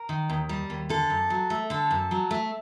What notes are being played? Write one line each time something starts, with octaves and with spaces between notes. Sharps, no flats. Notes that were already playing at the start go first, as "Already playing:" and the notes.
Already playing: A#4
D#3
D#2
G3
D#2
D3 A4
F#2
F#3
A3
D3 A4
F#2
F#3
A3